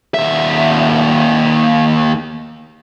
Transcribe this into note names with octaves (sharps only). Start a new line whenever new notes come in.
D#2 E5